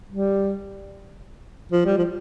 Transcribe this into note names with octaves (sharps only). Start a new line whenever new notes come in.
G3
F3
G3
F3